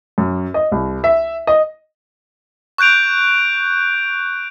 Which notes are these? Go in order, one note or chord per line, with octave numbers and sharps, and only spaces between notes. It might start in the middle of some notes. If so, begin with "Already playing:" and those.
F#2
D#5
C2
E5
D#5
C#6 F#6 G6 D7 F7